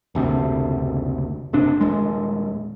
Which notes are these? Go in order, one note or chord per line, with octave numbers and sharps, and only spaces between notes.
F#1 D2 C3
F#1 C3 D4
D#1 G#3